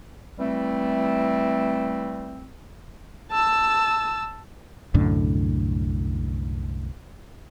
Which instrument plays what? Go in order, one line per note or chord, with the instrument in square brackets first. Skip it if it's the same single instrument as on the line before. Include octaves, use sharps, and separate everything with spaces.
[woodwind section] E3 G3 A3 C4
[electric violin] A5 E6
[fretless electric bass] C2 F#2 A2 D3